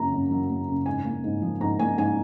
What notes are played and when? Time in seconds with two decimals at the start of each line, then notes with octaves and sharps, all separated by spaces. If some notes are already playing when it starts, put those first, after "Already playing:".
Already playing: F#2 C#3 F#3 A#3 A#5
0.13 F#2
0.31 F#3
0.49 A#3
0.68 C#3
0.86 G#2 G#5
1.05 A#3
1.24 G#2
1.42 F3
1.61 G#2 A#5
1.79 A#3 G#5
1.98 G#2 G#5